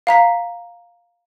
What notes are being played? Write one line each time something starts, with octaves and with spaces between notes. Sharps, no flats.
F5 A#5 B6